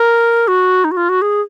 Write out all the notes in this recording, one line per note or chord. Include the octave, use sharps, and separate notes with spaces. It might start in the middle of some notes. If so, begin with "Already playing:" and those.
Already playing: A#4
F#4
D#4
F#4
F4
F#4
G#4